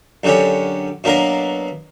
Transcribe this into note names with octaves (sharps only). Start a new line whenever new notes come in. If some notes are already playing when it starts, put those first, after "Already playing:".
F#2 D3 F#3 C#4 G4
B2 F#3 A#3 D4 A#4